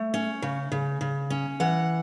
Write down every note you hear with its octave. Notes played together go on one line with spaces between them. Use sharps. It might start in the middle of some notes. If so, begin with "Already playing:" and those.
Already playing: A3
C#4
C#3
C#3
C#3
C#4
E3 F#5